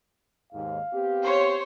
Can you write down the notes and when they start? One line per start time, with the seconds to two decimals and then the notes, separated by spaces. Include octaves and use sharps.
0.53 D#2 G#2 F5
0.94 B3 C4 G4
1.22 C5 C#5